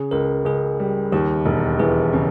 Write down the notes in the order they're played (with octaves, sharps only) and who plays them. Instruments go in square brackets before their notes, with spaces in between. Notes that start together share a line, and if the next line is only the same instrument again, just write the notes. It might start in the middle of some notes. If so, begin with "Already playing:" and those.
Already playing: [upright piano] C#3 [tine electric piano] G#4
[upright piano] C#2 [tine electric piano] A#4
[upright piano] C#2 [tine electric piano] G#4
[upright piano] G3
[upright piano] D#2 [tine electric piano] G4
[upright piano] E1
[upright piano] E3 [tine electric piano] G#4
[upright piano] C#3